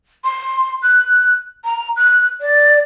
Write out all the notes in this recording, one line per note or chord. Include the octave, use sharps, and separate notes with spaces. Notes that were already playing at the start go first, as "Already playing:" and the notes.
C6
F#6
A#5
F#6
D5